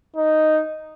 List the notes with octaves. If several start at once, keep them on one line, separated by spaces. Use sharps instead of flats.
D#4